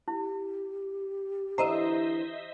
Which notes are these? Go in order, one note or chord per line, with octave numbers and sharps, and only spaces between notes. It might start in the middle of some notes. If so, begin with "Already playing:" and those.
E4 G4
D3 E3 C5 D#5 E5 A#5